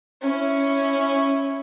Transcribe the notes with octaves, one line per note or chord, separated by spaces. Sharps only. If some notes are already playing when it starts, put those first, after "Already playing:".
C#4 E4